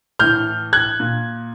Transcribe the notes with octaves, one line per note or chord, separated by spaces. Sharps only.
A2 E3 F6 G6
F#6 G#6
A#2